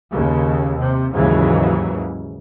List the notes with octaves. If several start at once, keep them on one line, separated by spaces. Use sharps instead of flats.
D#2 C#3
C3
D#2 G#2 C#3 E3 F#3